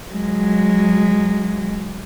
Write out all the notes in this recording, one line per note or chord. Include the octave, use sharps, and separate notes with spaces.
F#3 G#3